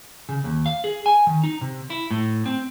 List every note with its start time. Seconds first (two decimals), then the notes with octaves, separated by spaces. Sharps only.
0.29 C#3
0.44 D#2
0.66 F5
0.84 G#4
1.06 G#5
1.27 D#3
1.43 D#4
1.61 C3
1.90 E4
2.11 A2
2.46 C4